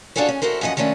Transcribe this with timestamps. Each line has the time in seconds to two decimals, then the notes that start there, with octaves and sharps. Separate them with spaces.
0.16 D4 F4 F#4 G#4 A4 C#5
0.29 C#4
0.42 E4 F#4 A4 A#4 C5
0.61 F#2 E3 F3 D#5 F#5
0.77 D#3 F3 A3 C#4 D4